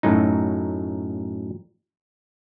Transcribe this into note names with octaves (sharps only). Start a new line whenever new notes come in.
F#2 A2 F#3 D#4